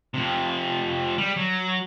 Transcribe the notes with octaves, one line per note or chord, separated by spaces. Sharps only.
F2 C3
G3
F#3